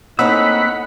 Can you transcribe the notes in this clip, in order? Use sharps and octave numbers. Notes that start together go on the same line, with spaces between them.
A2 A#3 C4 C#4 D#4 F#5 B5 E6